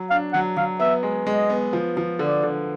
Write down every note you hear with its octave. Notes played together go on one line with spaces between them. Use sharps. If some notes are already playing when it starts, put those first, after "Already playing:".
Already playing: F#3
D4 F5
F#3 F#5
F#3 F5
B3 E5
G#3
G#3 D#5
B3
F3
F3
D3 D5
D3